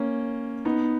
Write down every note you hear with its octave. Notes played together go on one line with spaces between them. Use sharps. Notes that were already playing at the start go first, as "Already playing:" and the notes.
Already playing: A#3 C#4
B3 D#4